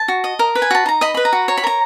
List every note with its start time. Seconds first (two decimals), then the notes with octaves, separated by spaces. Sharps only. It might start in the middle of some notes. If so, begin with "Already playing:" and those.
Already playing: A5
0.08 F#4
0.24 D#5
0.39 A#4
0.55 B4
0.62 G#5
0.71 F#4 A5
0.86 D#4 A#5
1.01 D#5 B5
1.14 B4 B5
1.25 A#5
1.33 F#4
1.48 C#5 A#5
1.57 B5
1.64 A#4 A#5